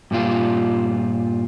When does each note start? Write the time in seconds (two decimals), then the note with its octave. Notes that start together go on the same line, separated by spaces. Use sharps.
0.11 G2 A#2 G3 F4